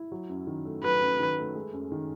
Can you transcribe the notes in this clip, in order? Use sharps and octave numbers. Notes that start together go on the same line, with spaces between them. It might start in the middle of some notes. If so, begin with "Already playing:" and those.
Already playing: E4
F#3
F#2
D#3
A3
F#3 B4
F#2
D#3
A3
G#3
F#2
D#3